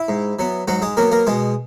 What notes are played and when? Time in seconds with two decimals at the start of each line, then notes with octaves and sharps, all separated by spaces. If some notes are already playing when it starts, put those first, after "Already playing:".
Already playing: E4
0.08 G#2
0.39 F#3 B3
0.68 G#2 F#3 F#4
0.82 G#3 G#4
0.97 F#3 A#3 B3 A#4
1.11 A#3 A#4
1.27 B2 G#3 G#4